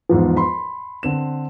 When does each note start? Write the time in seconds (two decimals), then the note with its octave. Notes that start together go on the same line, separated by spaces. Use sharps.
0.09 E2 G#2 F3
0.37 B5 C6
1.03 D3 C4 E7